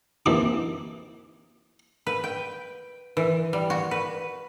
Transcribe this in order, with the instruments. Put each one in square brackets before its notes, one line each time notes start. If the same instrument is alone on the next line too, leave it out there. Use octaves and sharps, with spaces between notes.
[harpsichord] E3 G3 A#3 C4 D4 D#4
[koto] B4
G5
E3
G3
F#4
B4